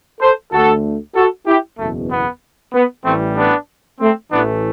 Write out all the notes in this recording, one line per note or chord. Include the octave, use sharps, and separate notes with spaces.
A4 C5
D2 D3 A3 F#4 A4
F#4 A4
E4 G4
F#1 E2 B2 A3
B3
B3
A1 A2 E3 G3 A3 C4
B3 D4
A3 C4
A1 A2 E3 A3 B3 D4